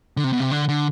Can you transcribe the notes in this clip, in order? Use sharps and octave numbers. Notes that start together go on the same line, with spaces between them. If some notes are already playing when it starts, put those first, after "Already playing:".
D3
C3
B2
C3
D3
D3